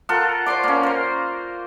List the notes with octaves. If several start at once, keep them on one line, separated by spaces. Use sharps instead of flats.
F4 A4 A#4 F#5
C5 D5 C6 D6
A#3 C#4
A#4 C5